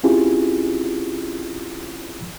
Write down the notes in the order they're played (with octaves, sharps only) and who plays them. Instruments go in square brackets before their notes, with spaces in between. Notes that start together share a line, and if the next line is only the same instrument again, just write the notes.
[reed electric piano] C4 C#4 E4 F4 G4 G#4